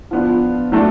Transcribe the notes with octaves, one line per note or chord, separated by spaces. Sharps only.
F3 B3 D4 F4
F#3 A3 D4